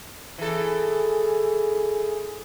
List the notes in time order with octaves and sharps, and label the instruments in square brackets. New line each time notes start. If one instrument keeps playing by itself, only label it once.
[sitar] E3 A4 [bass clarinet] G#4